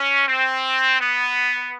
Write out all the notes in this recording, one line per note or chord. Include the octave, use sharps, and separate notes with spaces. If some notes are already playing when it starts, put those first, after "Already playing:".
Already playing: C#4
C4
B3